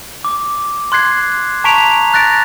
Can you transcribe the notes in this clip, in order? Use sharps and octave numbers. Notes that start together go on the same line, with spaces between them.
D6
C6 F#6 G#6 C7
A5 A#5 C#6 B6 D7 F7
F#6 A6 A#6 D7